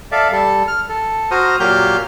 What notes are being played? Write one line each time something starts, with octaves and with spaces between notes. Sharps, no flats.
A4 D5 E5 F5
G3 A4
F6
A4
F#4 C5 A#5 D#6 F6
A#2 F#3 A#3 G4 F6 G6